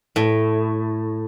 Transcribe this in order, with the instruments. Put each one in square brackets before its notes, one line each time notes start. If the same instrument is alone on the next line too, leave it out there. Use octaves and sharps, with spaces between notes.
[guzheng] A2